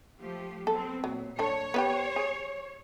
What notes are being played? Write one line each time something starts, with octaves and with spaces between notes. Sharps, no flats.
F3 A3 G4
F#3 B3 C4 A4
A#2 F#3
D4 A4 C#5
B3 F#4 G4
G#4